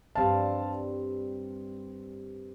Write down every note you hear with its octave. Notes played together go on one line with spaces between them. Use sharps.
G2 G3 C4 F5 A5